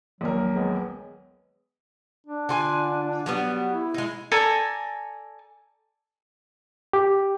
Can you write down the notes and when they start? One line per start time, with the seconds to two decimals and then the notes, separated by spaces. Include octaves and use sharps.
0.21 A#1 D#2 F#3 A#4
0.55 G#3 B3 G#4
2.26 D4
2.49 D3 F4 G#5
3.26 F#3 G3 B3
3.72 E4
3.94 G#3 D#4
4.32 A4 D5 G#5 A#5
6.93 G4